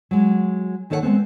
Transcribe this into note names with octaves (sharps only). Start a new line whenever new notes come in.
F#3 G#3
D#2 D#3 A4 C#5 D5 F#5
G#3 A3 B3 C4